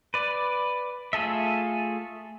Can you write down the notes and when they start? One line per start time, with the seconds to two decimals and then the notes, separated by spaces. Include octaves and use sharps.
0.14 B4 D5
1.13 A3 F4 G#4 A4 E5